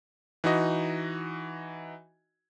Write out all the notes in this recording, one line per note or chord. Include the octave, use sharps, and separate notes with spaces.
E3 D#4 F#4 D#5